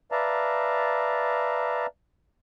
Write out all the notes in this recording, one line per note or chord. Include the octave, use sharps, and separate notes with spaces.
B4 D5 E5 F5 A5 A#5